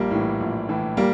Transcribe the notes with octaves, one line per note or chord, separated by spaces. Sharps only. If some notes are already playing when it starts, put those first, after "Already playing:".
Already playing: A#1 G3 A#3
A2 E3
A#1
A2 E3
G3 A#3